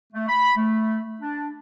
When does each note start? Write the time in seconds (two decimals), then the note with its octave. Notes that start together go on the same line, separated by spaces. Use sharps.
0.13 A3
0.28 B5
0.57 A3
1.21 D4